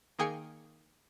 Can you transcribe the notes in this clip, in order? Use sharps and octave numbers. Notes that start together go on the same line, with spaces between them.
D#3 A#3 G#4 G5 G#5 C#7